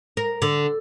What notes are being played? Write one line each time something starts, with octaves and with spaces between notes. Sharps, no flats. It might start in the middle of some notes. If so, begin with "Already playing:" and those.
A#4
D3